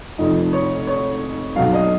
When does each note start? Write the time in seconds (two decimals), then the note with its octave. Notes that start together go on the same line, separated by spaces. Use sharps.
0.18 F1 F2 F3 D#4
0.53 C#5
0.87 C#5
1.56 B1 B2 F#3 F5
1.73 D#5